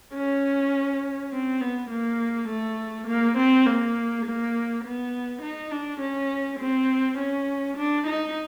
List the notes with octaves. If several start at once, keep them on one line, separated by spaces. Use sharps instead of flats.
C#4
C4
B3
A#3
A3
A#3
C4
A#3
A#3
B3
D#4
D4
C#4
C4
C#4
D4
D#4